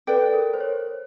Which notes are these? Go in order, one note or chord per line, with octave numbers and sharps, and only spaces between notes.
A4 B4 D5 G5
A#4
C5
C#5